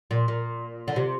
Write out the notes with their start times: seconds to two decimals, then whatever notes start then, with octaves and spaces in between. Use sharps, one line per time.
0.11 A#2
0.28 A#2
0.88 D3
0.96 C3